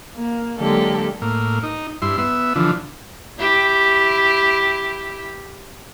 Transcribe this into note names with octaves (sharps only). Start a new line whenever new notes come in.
A#3
D3 F#3 G#3 A#3 G4 A4
A2 A#3
D#4
G2 E4 C6
B3 E5
D3 E3 F3
E4 G4